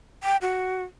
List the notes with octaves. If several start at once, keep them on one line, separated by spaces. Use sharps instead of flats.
G5
F#4